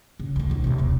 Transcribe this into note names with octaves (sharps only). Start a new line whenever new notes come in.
C#3
D2 C4
D#1 B1
B1 C3
D#1 B1